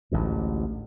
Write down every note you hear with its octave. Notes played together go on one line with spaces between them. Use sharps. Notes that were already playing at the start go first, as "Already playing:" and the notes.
A1 D2 G#2